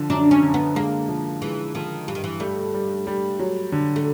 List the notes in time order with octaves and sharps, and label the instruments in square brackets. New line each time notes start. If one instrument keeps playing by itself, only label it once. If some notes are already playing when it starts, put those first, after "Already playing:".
Already playing: [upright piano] D3 F3
[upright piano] F#2 [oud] D4
[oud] C#4
[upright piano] D3
[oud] B3
[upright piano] G#3 [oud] A#3
[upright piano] F3
[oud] E3 [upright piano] G#3
[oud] D#3 [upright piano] F3
[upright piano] G2 [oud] E3
[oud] D#3
E3
[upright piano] G3 [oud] A3
[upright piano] G3
G3
F#3
D3
[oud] A3